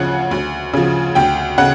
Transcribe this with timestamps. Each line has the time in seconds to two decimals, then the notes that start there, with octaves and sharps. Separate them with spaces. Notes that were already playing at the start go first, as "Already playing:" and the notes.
Already playing: D2 C#3 F3 F#5
0.31 D2
0.74 C#3 F3
1.15 D2 G5
1.58 C#3 F#5